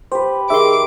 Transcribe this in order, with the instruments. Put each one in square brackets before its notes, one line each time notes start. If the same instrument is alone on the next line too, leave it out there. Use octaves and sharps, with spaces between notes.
[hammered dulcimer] G4 B4 [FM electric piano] C5
[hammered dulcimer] D#3 D#4 [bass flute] G#4 [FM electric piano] E5 C6 [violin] D6